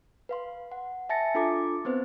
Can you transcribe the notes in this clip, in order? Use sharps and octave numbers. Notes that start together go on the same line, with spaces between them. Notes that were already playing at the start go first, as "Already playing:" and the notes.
B4 F5 C6
F#5
E5 G#5 A5 A6 A#6 C#7
D4 F4 A4 A#5 D6 A6
B3 C4 B4 C5